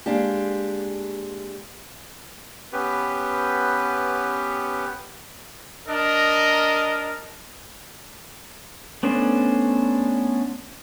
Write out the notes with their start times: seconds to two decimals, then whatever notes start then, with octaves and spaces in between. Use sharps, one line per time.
0.06 G#3 A#3 D4 G4
2.73 B3 C#4 G4 B4
5.87 D4 A#4 D#5
9.03 A3 B3 C#4 D4 C5